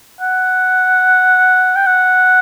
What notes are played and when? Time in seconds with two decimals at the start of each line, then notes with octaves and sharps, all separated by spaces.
0.21 F#5
1.76 G5
1.86 F#5